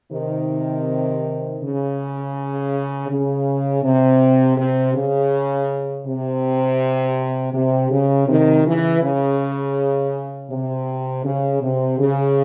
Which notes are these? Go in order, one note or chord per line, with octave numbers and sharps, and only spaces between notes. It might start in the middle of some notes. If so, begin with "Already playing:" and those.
C3 D#3
C#3
C#3
C3
C3
C#3
C3
C3
C#3
C3 D#3
C#3 E3
C#3
C3
C#3
C3
C#3